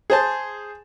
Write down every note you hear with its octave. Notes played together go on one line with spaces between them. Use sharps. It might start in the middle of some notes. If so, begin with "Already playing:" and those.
G#4 C5 A5